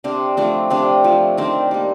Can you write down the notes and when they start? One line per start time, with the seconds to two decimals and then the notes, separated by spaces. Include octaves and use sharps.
0.04 C3 C4 D4
0.37 F3 A3 C4 D4
0.70 C3 C4 D4
1.04 F3 A3
1.37 D#3 C4 D4
1.71 G3 A#3